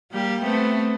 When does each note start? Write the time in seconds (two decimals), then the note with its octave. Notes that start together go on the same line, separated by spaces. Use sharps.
0.12 G3 A#3 G4
0.42 A3 B3 C4